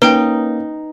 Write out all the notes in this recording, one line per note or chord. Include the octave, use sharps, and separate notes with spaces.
A#3 C#4 D#4 B4 G5 D7 G7